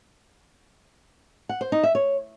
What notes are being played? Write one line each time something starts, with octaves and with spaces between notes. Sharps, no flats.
F#5
C5
D#4
E5
C#5